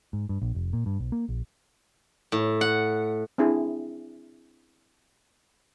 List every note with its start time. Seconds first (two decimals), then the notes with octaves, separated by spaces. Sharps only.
0.13 G#2
0.29 G2
0.42 A#1
0.55 F1
0.73 A#2
0.86 G2
0.99 B1
1.12 A#3
1.29 A#1
2.32 A2
2.61 F#5
3.38 C4 D4 E4 G#4